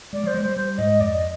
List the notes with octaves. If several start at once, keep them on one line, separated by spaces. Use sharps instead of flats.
G#3 D5
F3 C5
G#3
G3 C5
G3 C5
G#2 D#5
F2 D5
D#5